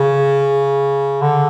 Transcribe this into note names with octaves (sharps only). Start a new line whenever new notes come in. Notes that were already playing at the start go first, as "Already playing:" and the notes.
Already playing: C#3
D3